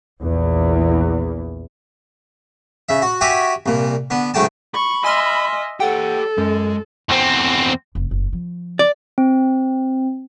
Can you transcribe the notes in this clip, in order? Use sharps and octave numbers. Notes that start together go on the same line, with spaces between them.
A#1 E2
C#3 E5
F#4
F#4 G4 E5 G5 G#5
C2 A#2
D3 B3
C#2 G#2 F#3 A3 G5 A5
B5 C#6
D#5 E5 G#5 C6 F6
G4 A4 C#5 F#5 G5
F#2 G#3
E2 C4
F1
F#1
F3
D5
C4